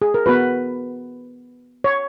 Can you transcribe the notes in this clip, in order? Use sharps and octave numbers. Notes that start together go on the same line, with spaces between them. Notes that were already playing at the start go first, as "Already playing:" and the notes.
G#4
A#4
B3 F#4 B4
C#5